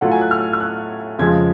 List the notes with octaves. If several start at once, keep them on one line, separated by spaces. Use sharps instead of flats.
A2 F#3 A3 F4 F#5
G#5
F#6
F6
F6
F#6
F2 C#3 F3 G#3 G#6